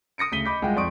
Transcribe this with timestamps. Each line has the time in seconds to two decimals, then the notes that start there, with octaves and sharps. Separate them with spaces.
0.18 D#6 A#6 C#7 D7
0.32 D2 C#3 B6 D#7 G7
0.45 D#5 B5 D6 G6 B6
0.62 C2 G#3 F4 F#5 G5
0.76 F2 D5 C6 C#6 D#6 D7